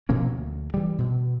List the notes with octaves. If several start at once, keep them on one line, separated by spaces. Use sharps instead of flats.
B2 F3 A#3 C#4
D2
E3 G3
B2